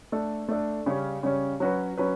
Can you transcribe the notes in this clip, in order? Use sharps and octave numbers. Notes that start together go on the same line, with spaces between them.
A3 D4 A4
A3 D4 A4
C#3 G3 C#4
C#3 G3 C#4
F#3 C#4 F#4 B4
F#3 C#4 F#4 B4